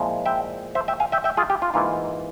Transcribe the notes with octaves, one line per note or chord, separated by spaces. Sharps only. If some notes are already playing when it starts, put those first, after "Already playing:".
Already playing: A#2 F3 G#3 E4
E5 G5
C5 E5
E5 G5
F5 G#5
E5 G5
E5 G5
F4 G#4
G4
F4
G#2 E3 A#3 F4